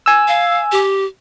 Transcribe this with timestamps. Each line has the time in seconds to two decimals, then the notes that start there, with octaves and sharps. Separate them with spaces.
0.06 G#5 E6
0.28 F5
0.72 G4